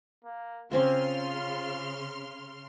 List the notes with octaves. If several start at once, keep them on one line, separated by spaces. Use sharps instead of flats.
A#3
C#3 A#3 C4 C#4 F4 C6 F6